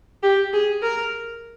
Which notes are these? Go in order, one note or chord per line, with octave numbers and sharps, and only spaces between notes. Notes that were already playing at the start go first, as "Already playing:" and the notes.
G4
G#4
A#4